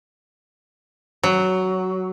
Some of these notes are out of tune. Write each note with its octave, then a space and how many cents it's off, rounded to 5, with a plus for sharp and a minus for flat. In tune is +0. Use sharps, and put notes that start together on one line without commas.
F#3 +10